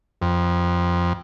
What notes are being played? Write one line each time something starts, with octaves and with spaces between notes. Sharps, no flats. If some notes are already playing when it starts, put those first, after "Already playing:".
F2